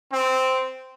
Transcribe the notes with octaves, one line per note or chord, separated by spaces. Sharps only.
C4